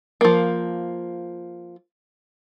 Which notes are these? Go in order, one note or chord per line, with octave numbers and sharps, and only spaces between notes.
F3 A#3